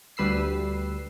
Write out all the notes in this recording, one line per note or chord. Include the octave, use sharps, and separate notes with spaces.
D2 G3 B4 E6 C7